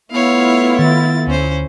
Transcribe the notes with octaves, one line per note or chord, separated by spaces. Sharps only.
A3 B3 E4 F4 C#5 F5
D#3 A6
D2 C#4 C5